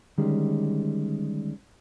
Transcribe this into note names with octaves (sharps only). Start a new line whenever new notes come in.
D3 D#3 G3 G#3 C#4